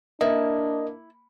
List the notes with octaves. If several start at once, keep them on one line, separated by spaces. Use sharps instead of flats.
A#3 D4 E4 D#5